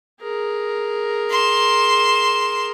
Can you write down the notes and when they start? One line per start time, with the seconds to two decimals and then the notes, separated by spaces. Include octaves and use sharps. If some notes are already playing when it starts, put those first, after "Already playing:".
0.21 G#4 A#4
1.30 C6 E7